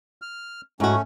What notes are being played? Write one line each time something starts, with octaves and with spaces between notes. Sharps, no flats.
F6
G#2 A3 C#4 F#4